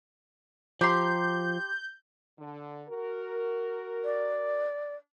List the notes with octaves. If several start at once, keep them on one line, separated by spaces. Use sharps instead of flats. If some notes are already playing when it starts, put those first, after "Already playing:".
F3 G4 A#5 C6 G6
D3
F#4 A#4
D5